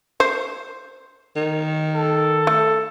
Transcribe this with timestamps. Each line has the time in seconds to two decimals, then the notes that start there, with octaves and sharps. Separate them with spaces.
0.20 C5
1.36 D#3
1.96 A4
2.47 A3